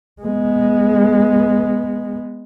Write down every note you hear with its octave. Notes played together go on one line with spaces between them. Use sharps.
G#3 B3